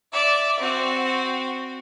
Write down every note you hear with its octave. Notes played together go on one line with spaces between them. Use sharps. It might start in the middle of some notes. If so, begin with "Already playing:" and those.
D5 E5
C4 F#4